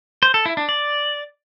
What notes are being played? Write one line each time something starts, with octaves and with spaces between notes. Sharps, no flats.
C5
A4
E4
D4
D5